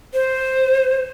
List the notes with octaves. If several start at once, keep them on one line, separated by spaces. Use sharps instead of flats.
C5